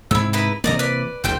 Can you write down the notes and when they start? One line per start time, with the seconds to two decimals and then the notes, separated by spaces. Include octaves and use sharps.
0.11 G#2 C3 E4 E6
0.33 D#4 E4 B4
0.64 C3 E3 A#3 D5 D#5 A#5
0.79 B4 D5
1.24 F#1 D2 C5 G5 G6